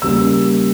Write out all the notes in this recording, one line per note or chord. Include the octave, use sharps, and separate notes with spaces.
C#3 G3 A#3 E6